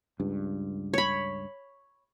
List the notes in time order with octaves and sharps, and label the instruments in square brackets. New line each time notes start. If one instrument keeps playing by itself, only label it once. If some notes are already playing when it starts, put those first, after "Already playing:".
[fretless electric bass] C#2 G2
[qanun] C#5 B5